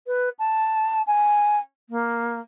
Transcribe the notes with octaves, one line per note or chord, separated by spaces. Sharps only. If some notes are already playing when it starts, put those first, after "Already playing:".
B4
A5
G#5
A#3